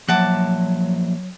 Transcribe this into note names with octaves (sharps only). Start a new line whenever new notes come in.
F3 F#3 A#3 E5 F#5 A5 D6